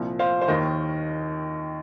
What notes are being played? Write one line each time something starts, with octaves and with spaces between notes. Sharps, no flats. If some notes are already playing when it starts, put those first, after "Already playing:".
Already playing: C2 A#2 F3
C5 F5
C5
D#2 D#3 A#4 D#5